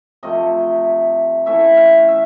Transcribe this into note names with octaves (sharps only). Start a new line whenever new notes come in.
C3 F3 A3 D#5
E3 A3 C#4 E4 E5
F5
E5